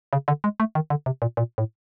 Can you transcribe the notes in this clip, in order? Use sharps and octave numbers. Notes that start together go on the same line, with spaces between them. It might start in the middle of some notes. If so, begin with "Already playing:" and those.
C#3
D3
G#3
A3
D#3
D3
C3
A#2
A#2
A2